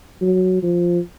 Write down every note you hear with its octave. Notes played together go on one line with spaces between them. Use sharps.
F#3
F3